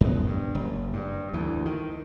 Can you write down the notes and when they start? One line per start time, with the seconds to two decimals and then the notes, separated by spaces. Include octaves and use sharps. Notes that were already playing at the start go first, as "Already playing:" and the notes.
0.01 F#2 B3
0.26 G2
0.55 F#1
0.93 G2
1.33 D2 E3
1.66 D#3